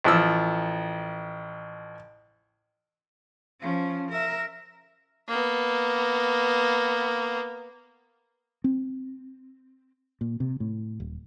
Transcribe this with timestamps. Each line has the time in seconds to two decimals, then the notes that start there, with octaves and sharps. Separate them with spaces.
0.04 A1 F3 E6
3.60 F3 C#4
4.10 A#4 E5
5.28 A#3 B3
8.64 C4
10.21 A#2
10.40 C3
10.60 A2
11.00 D#1